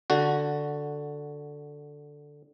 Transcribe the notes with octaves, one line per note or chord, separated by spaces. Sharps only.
D3 F#4